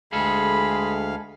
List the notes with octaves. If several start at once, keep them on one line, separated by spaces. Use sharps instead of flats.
D2 G#3 G#4 A4 F5 B5